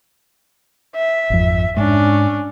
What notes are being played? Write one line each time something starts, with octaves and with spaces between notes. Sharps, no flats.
E5
G#1 F2
G#2 C#4 D4